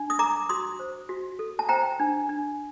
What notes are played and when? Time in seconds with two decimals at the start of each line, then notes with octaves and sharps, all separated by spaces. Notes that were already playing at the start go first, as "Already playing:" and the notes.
Already playing: D4
0.10 D#6
0.19 A#4 A#5 D6
0.49 F#4 C6 D#6
0.79 C5
1.09 F#4
1.39 A4
1.59 A5
1.69 C5 G5 A#5
2.00 D4
2.29 D4